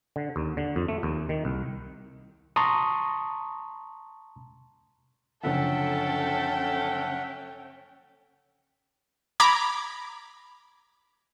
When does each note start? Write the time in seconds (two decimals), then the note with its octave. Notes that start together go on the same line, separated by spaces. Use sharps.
0.16 D3
0.36 D#2
0.57 D3
0.76 F2
0.88 A3
1.03 D#2
1.29 D#3
1.45 C2
2.56 A5 A#5 C6 C#6 D#6
5.43 F#1 D3 F3 C#4 A4 E5 F#5 G5
9.40 A#5 B5 D6 G#6